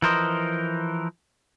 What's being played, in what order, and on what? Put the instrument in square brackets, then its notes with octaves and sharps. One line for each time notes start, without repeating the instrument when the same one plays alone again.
[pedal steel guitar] E3 F3 A#4 C5 D#5